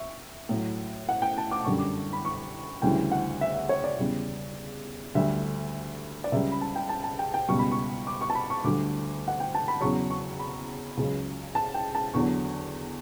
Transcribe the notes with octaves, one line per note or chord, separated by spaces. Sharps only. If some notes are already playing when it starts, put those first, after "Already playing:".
Already playing: E5 C#6
A2 F#3
F#5
G5
A5
D6
F#2 D3 G3 C#6
D6
B5
C#6
D2 C#3 E3 G3 G5
F#5
E5
E5
C#5
D5
E2 C#3 G3
D2 D3 G3 E5
D5
C#2 C#3 G3 E5
B5
A5
G5
A5
A5
G5
G5
C#2 B2 G3 C#6
B5
C#6
D6
C#6
A5
B5
C#6
D2 D3 G3 D6
F#5
G5
A5
B5
E2 C#3 F#3 C#6
C#6
B5
C#2 C#3 F#3
A5
G5
A5
E2 D3 F#3 C#6